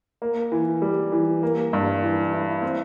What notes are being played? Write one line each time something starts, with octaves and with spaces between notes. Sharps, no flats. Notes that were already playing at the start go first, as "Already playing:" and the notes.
A#3
E3
G3
E3
A#3
G2
E3
E4
C4